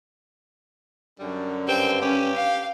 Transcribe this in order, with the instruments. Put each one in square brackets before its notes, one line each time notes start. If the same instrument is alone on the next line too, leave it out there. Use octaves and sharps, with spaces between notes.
[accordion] F#2 D3 [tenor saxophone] G3
[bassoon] G2 [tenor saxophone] C4 [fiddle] G5
[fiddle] C#4 [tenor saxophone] G4
[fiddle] F5